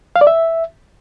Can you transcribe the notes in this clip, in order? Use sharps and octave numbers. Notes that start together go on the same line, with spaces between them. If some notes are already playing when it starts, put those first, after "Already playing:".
F5
D5
E5